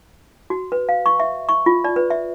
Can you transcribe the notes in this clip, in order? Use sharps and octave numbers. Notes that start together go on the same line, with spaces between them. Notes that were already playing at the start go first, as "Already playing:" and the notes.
F#4
B4
F5
C#6
E5
C#6
F4
D5
B4
E5